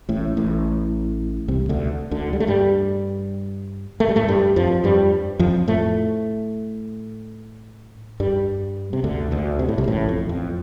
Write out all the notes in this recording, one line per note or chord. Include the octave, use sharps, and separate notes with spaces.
A1 A2
A1 A2
C2 C3
D2 D3
D2 D3
G3
A3
G2 G3
A3
G3
A2 A3
G2 G3
F2 F3
G2 G3
F2 F3
A2 A3
G2 G3
C3
D2 D3
D2 D3
C3
A2
C2 C3
A1 A2
F2
F2